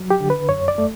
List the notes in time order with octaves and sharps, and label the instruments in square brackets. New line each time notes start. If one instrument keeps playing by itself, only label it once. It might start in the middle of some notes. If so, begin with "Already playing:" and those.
Already playing: [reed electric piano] F#3
G4
D3
B4
F#2 C#5
D5
A3